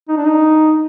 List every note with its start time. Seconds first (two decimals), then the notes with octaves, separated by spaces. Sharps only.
0.09 D#4
0.17 D4
0.25 D#4